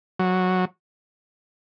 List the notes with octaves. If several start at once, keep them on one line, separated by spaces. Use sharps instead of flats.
F#3